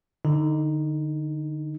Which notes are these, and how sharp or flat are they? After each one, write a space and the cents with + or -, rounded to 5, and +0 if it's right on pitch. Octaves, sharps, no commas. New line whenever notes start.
D3 +20 D#4 +0